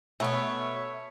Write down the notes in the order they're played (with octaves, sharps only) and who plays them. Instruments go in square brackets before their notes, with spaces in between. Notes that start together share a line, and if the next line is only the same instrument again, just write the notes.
[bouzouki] B2 G#5 [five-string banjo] A3 B3 [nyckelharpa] C#5 [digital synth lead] E5